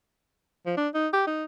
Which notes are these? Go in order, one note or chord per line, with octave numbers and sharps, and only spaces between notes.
F3
D4
D#4
G4
D#4